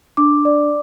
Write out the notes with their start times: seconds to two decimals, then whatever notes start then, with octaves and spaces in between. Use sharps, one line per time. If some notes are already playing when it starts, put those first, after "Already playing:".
0.17 D4 D6
0.45 D5